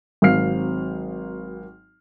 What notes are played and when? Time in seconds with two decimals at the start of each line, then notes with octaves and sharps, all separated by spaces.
0.22 G#1 F#3 C4 F5 F6 C7